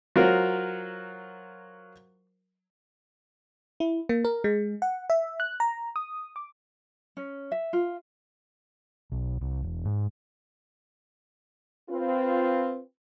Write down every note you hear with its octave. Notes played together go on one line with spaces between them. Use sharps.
F#3 F4 F#4 A#4 C5
E4
A#3
A#4
G#3
F#5
E5
F#6
A#5
D#6
D6
C#4
E5
F4
B1
C2
E1
G#2
C4 F4 B4